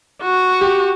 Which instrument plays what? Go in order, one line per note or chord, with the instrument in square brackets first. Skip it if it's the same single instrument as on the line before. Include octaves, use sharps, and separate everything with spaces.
[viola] F#4
[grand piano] G4